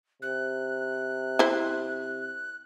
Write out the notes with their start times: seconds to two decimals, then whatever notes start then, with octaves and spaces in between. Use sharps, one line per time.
0.22 C3 F#6
1.39 E4 C5